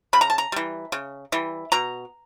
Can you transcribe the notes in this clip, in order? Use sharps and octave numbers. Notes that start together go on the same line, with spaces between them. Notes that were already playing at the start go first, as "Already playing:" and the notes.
C#3 B5
A#5
A5
A#5
E3 G3
C#3
E3 G3
B2 A#5